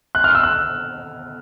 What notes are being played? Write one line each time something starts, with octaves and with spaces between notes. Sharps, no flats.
F#6
F6
E6
F#6